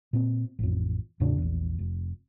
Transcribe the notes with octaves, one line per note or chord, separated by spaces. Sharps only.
A#2 C4
A1 F2
E2 A2 C#3 D4
A#1 E2
F1